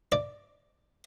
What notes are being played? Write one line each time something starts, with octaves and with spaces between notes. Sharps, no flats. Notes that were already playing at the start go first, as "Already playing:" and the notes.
D5